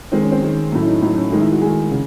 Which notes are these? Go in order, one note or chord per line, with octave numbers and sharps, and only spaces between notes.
D#3 G#3 C4
C#4
C4
D#3 G#3
A2 F#3 A3 C#4
E4
D#4
A2 F#3 A3 D#4
C#4
D#3 G#3 D#4
E4
F#4
D#3 G#3 G#4
C#3